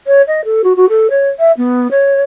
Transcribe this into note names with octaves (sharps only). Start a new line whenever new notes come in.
C#5
D#5
A4
F#4
F#4
A4
C#5
E5
B3
C#5